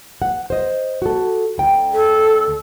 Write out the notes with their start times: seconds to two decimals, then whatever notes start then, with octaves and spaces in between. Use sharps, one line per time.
0.22 F#5
0.50 C5 D#5
1.02 F#4 A4
1.58 D2 G5
1.92 A4